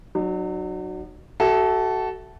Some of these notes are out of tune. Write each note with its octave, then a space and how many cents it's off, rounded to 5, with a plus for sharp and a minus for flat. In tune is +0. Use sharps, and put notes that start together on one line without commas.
F#3 +0 D#4 -45
F#4 +30 A4 -10 E5 +0